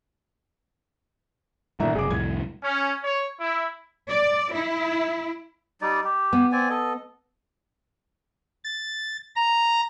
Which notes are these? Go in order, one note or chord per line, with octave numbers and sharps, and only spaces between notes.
G1 A#2 D#3 E5 A#5
F#1 C3 G#4 D6
C2 F2 A2 G#6
C#4
C#5
E4
D5
E4
G3 D#4 D5
G4
B3
C4 D5 G#5
A4 D#5
A6
A#5